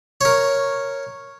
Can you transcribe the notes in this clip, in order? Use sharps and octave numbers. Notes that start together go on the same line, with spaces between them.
A#4 C#5